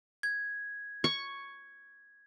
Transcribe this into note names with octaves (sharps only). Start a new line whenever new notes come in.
G#6
C#6